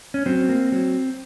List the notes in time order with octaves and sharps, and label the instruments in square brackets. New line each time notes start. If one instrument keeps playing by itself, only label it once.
[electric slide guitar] C#4
F#3 C4
A#3
F#3